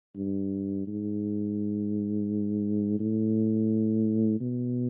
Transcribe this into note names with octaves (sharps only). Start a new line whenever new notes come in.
G2
G#2
A2
B2